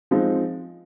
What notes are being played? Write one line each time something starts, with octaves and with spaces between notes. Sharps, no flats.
F3 G#3 C4 D#4